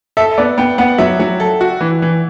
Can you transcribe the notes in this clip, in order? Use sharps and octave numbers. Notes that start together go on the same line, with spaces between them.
A4 E5
B3 D5
B3 G5
B3 F#5
F#3 E5
F#3
A4
F#4
E3
E3